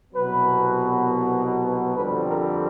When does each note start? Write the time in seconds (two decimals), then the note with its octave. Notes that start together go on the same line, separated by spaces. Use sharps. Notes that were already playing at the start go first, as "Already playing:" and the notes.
0.13 C2 B2 F#3 B3 B4
1.96 F2 D3 G3 C4 B4
2.27 A#4